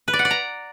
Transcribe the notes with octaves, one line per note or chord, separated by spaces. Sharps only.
B4
D5
F#5
D5
A#5